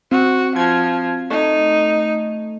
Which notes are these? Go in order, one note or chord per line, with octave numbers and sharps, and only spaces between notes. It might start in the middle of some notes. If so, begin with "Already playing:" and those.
C4 F#4
F3 G#6
A3 D#4